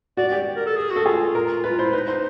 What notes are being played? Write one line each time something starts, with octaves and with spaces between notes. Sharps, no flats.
F#4 D5
G4 D5
A#4
A4
G#4
F#4
A4
F4 G#4
A#4
F4 B4
E4 C5
D#4 B4
C5